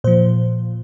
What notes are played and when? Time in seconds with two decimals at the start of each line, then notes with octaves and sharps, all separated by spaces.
0.04 A#2 F3 C5